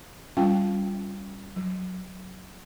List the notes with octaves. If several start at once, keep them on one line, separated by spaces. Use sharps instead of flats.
G3 C#4 F4 F5 G5
F#3